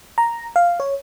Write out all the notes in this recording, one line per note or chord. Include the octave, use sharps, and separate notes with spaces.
A#5
F5
C#5